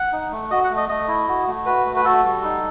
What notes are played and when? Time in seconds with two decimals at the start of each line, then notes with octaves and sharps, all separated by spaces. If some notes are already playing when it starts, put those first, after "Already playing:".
Already playing: F#5
0.13 D#4
0.32 A3
0.51 F#4 D#5
0.64 F#5
0.70 A3
0.77 D#5
0.89 A3 D#5
1.08 E4
1.28 F#4
1.47 A3
1.66 F#4 B4
1.85 A3
1.96 B4
2.04 F#4 A4
2.24 G3
2.43 D#4